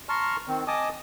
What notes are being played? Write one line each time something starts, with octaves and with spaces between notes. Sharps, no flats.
A5 A#5 C6 C#6 F6
D#3 C4
D#5 G#5 A5 D6 D#6